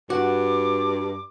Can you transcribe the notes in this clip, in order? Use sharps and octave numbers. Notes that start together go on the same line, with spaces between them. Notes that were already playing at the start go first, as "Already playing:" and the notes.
G2 F#4 D6